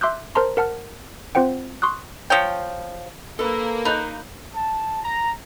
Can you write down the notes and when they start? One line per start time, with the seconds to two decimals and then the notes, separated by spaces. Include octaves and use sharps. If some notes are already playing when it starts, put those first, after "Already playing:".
0.01 E5 C6 D6 E6 F#6 G6
0.35 A#4 C5 A5 A#5 C6
0.57 A#4 F#5 A5 F6
1.35 C4 F4 C5 F#5 G5
1.82 C6 C#6 D#6 F#6
2.30 F3 C#5 G5
3.39 A#3 A4 B4
3.85 D#4 B5 F#6 G6
4.54 A5
5.03 A#5